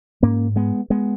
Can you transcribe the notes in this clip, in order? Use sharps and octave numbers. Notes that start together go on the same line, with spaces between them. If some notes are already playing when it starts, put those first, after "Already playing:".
G#2 A#3 C#4
G#3 B3
G#3 B3